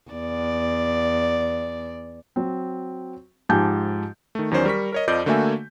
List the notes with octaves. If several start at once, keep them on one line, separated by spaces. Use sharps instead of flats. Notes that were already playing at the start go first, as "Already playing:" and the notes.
E2 D5
F#3 C4
G#2 F3 G4 G#5 A5 G6
D#3 A3
E2 D#3 F#3 C#4 C5 D5
G3 A#4 C#6 B6
A#4 C#5 D#5
F2 F3 D5 D#5 D6 G6
D3 A3 A#3 F#4 E5 G#5